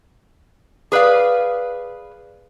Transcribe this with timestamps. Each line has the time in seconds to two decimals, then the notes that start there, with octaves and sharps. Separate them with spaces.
0.92 G#4 B4 D5 F5